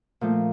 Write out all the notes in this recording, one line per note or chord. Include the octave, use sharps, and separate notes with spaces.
A#2 F3 A3